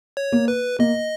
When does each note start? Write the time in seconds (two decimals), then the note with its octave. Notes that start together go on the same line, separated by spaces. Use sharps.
0.17 C#5
0.32 A#3
0.48 B4
0.79 A#3 D#5